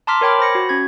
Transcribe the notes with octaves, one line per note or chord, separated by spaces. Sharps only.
A5 A#5 C6 D6 F6 B6
A#4 C#5 G5 B5 D6
C5 B5 A#6 C#7
F#4
C#4 G#6